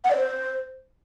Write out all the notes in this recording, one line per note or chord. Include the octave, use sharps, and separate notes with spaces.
F#5
D5
C5